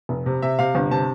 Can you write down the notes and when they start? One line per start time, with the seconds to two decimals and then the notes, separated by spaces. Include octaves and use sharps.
0.09 F1
0.26 C3
0.42 C3 E5
0.59 C3 F5
0.75 G1
0.91 C3 A5